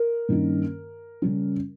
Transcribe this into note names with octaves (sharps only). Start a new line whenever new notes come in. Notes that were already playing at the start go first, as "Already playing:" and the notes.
Already playing: A#4
G2 D#3 A#3 C#4
C#3 G3 C#4